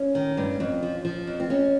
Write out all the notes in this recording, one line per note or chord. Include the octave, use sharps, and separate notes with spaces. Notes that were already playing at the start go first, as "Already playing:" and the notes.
Already playing: C#4
D#3
G2
F2
F3
F3
F2
C4
F2 C#4